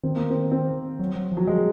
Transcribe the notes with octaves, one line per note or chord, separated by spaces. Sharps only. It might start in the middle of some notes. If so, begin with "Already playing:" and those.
D#3 C4
A#3
C4
C4
F#3
F#3
F3
F#3
F3 G#3